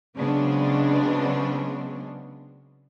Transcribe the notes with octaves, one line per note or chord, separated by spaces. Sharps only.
C#3 F#3 G#3 B3 C4 D4